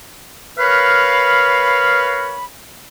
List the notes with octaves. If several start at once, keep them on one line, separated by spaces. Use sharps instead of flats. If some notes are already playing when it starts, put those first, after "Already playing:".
A#4 B4 C#5 F5 B5